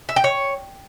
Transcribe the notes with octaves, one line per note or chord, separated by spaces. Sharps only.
E5
G5
C#5